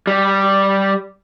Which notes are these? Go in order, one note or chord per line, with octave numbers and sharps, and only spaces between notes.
G3